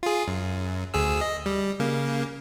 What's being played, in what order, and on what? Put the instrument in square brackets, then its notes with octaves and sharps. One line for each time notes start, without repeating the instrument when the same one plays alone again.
[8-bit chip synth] F4 G#4
F#2
D2 G#4 E6
D#5
G3
C#3 A#3